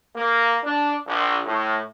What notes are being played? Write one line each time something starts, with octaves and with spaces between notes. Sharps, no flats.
A#3
D4
A#1
A2